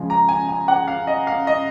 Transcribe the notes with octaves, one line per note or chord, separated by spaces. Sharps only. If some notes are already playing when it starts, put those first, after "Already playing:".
Already playing: C#3 F3 G#3
A#5
G#5
G#5
F#5
F5
D#5
F5
D#5